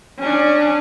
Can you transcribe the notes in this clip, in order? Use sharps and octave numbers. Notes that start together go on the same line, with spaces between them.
C#4 D4